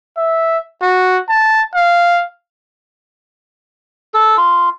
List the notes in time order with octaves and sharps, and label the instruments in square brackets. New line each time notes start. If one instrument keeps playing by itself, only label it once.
[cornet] E5
F#4
A5
F5
[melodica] A4
F4